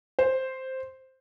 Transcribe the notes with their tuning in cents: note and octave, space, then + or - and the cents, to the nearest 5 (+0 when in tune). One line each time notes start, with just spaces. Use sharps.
C5 +0